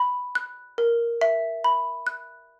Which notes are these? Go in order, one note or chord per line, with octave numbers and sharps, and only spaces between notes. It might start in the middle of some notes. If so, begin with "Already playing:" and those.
Already playing: B5
F#6
A#4
E5
B5
F#6